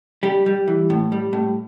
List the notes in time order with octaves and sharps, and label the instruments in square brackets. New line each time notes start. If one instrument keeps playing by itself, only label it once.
[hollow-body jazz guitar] G3 G4
G3
E3
A2
G3
A2